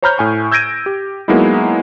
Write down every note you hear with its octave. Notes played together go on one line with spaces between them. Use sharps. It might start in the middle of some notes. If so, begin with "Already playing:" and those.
C5 C#5 A#5 B5 F6 G6
A2 G#5 C#6
E6 G6 G#6 A#6 D7 D#7
G4
F#3 G#3 A#3 B3 D#4 E4